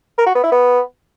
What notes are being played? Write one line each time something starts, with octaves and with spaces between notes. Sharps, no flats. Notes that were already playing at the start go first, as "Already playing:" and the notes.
A#4
F#4
B3
E4
B3